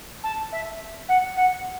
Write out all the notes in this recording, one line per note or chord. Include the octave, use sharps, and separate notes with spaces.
A5
E5
F#5
F#5